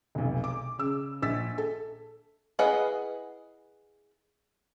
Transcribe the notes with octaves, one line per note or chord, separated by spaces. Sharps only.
F1 B1
D6
C#3 E6
A#1 E6 A6 B6
A4
E4 G#4 B4 D#5 F#5